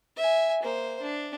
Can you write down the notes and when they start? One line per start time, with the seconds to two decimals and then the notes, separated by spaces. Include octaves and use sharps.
0.17 E5 G#5
0.63 A#3 C5
1.02 D4